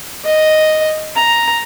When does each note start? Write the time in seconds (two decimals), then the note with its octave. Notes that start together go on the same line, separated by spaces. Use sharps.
0.24 D#5
1.15 A#5